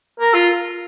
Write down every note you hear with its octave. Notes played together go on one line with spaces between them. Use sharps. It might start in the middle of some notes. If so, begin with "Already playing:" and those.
A#4
F4